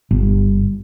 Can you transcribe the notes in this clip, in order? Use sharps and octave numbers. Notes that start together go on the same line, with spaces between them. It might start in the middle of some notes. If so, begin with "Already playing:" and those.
G1